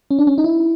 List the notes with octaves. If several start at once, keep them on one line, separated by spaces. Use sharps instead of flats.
C#4
D4
C#4
D#4
E4